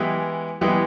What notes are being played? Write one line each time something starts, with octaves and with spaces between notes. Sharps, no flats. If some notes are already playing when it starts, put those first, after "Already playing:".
Already playing: E3 G#3 B3 E4 G4
E3 G#3 B3 E4 G4